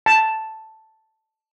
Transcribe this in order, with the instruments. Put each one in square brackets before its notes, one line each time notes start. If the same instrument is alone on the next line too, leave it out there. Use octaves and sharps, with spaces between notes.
[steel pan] A5